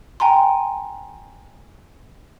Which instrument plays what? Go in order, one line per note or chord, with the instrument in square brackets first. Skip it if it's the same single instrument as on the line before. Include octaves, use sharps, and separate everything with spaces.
[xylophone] G5 G#5 A#5 C6